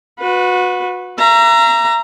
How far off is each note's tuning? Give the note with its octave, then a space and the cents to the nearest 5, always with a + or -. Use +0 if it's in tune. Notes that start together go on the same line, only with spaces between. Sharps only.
F#4 -30 B4 +0
E5 +45 A#5 +0